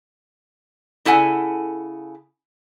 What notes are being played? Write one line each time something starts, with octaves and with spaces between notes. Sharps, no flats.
C#3 E4 A4 F#5 G#5